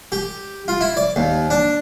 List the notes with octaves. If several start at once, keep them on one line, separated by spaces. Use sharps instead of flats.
G4
F4
E4
D5
D#2
D4